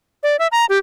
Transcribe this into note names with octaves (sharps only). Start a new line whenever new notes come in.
D5
E5
A#5
G4